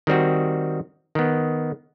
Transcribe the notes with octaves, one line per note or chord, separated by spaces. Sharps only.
D#3 G3 C4 F#4
D#3 B3